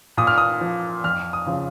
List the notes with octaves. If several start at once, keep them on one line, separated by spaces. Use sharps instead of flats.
A#2 D#6
F6
D#6
F3
F2 F6
D#6
C#3 F3